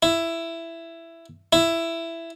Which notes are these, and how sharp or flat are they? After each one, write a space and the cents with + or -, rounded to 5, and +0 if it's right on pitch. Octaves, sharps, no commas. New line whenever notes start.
E4 +10
E4 +10